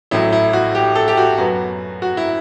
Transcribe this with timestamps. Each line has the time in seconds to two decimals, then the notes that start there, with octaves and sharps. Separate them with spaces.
0.11 A1 A2 F#3 E4
0.32 E4
0.53 F#4
0.75 G4
0.95 A4
1.08 G4
1.17 F#4
1.38 F#2 F#3 B3 F#4
2.02 F#4
2.17 E4